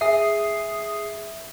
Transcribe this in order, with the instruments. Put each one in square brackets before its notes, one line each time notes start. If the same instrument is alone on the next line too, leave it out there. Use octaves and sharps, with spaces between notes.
[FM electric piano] G#4 D#6 C7 [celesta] E5